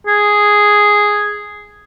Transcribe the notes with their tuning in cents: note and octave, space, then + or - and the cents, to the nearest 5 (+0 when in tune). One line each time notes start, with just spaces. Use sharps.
G#4 +0